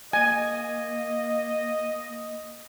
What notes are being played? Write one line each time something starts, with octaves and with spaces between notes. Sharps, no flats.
A#3 D#5 G#5